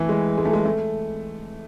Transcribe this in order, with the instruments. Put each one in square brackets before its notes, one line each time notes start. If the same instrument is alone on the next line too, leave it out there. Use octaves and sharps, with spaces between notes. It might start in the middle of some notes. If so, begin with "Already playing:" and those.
Already playing: [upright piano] E3 A3
G#3
G#3
A3
G#3
A3